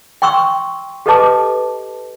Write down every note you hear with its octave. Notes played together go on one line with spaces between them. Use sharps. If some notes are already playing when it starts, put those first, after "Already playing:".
G5 C6 C#6 E6
G4 A4 B4 D#5 A5 D6